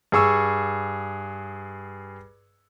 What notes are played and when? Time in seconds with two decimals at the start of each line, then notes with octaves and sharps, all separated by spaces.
0.12 G2 G#4 C#6 E6